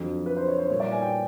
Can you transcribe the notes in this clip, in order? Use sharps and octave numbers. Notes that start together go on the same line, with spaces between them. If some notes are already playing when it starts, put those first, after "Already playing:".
Already playing: F2 D3 F#3
B4
C5
C#5
C5
A#2 G3 B3 C#5
D5
G#5
G5